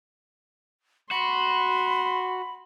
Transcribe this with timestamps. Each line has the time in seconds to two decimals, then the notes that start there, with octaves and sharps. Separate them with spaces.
1.11 F#4 B5 C6